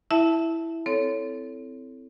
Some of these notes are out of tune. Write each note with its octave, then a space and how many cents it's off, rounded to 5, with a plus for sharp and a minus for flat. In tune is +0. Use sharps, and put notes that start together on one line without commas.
E4 +0 E5 +0 A5 +0
C4 -10 A4 +0 C#5 +15